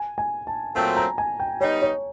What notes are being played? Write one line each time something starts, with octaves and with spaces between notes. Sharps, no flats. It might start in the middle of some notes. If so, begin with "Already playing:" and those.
Already playing: G#5
G#5
A5
A#2 F#3 A3 C4 A5
A#5
G#5
G5
G3 B3 D#4 C#5
C#5